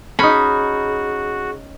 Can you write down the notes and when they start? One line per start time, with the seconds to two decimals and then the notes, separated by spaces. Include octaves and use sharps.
0.19 C#4 D#4 F#4 G#4 B5